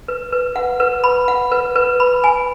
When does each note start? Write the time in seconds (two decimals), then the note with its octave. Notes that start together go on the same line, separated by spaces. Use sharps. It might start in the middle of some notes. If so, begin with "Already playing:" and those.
0.08 B4
0.32 B4
0.56 F#5
0.80 B4
1.04 B5
1.28 F#5
1.52 B4
1.75 B4
2.00 B5
2.24 G#5